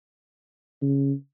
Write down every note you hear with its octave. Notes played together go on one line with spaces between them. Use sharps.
C#3